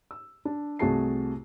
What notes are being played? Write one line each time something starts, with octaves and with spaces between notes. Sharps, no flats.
E6
D4
C2 A3 F#4 G#4 A5 C7